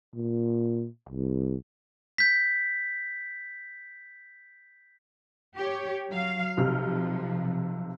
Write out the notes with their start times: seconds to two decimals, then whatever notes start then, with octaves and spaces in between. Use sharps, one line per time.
0.15 A#2
1.09 C2
2.18 G6 B6
5.56 G4 C#5
6.10 F#3 F5
6.57 B1 C3 F3 F6